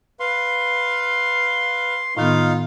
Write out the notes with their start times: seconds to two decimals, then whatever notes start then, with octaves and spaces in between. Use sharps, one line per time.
0.20 B4 F5 C6
2.17 A2 D#3 B3 D#4 F4 F5